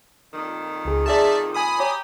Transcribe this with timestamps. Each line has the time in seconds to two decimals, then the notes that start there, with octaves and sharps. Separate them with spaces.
0.33 F2 A#2 D#3
0.85 C#2 G#4
1.06 G#4 D5 E5 A5
1.54 G#5 B5 D#6
1.79 G4 C#5 A#5